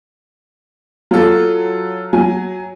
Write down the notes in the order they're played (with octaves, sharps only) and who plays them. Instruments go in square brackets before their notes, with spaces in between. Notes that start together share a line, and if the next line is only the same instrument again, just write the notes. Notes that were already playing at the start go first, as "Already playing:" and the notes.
[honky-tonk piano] F#3 [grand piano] F4 A4
[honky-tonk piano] F#3 [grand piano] G#5